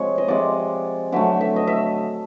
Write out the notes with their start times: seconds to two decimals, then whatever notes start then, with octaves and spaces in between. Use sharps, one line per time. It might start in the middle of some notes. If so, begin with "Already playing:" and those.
Already playing: C3 F3 G#3 C#5
0.18 D#5
0.28 C3 F3 G#3 D5
1.12 D3 F#3 A3 E5
1.41 E5
1.56 D#5
1.67 E5